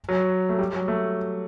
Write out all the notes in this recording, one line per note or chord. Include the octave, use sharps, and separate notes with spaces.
F#3
A3
G3
F#3
A3